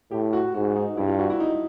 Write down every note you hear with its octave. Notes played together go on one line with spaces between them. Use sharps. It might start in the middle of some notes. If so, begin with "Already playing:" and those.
A2 G4
F#4
G#2 F#4
D#4
G2 E4
F4
F#4
E4
D#4